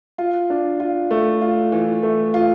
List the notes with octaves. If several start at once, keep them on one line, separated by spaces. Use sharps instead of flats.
F4
D4
F4
A3
F4
E3
A3
F4